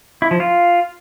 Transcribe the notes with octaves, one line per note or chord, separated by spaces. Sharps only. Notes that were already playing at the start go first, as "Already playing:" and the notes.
E4
F3
F4